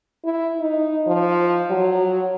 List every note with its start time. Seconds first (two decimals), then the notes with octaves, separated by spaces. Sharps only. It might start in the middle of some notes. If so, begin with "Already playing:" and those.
0.25 E4
0.60 D#4
1.07 F3
1.70 F#3